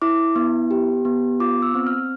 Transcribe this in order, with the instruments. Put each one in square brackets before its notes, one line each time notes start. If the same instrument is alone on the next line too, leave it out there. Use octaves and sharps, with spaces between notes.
[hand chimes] E4 D6
B3
G4
B3
F4 D6
E6
C4
F6